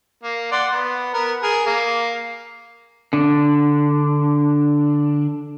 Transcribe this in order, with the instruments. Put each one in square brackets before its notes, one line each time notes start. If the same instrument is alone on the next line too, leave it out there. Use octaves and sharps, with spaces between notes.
[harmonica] A#3
D5 F#5 C6
B3
B3 A#4
G#4 A#4
A#3
[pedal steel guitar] D3 D4